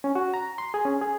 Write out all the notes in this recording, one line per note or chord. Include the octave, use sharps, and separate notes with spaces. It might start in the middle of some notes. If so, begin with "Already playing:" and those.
C#4
F#4
A#5
C6
G#4
C#4
G#4